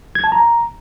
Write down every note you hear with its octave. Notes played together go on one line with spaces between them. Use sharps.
G#6
A5
A#5